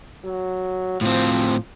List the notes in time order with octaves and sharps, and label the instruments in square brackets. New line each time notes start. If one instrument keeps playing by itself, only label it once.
[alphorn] F#3
[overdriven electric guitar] A2 C4 [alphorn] F3